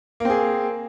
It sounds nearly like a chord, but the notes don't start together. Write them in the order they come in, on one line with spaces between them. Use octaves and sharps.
A#3 C4 G#4